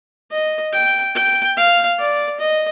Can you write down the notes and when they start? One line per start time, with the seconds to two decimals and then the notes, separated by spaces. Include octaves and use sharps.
0.32 D#5
0.73 G5
1.15 G5
1.57 F5
1.99 D5
2.40 D#5